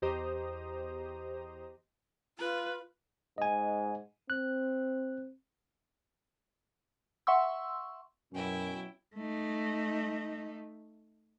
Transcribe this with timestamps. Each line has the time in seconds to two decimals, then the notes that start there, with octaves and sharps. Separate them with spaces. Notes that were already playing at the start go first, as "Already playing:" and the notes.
0.02 E2 G4 C5 D#5 A#5 D#6
2.39 F4 B4
3.38 G#2 D#5 G#5
4.30 C4 F#6
7.27 E5 F#5 C6 C#6 E6
8.33 F#2 B2 F#3 C#4 E4 G5
9.15 A3 D#4